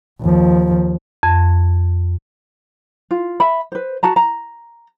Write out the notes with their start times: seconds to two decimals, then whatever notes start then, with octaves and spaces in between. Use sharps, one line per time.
0.21 D#2 F3
1.23 F2
3.11 F4
3.40 E5 B5
3.72 B4 C5
4.03 F#4 A5 A#5
4.16 A#5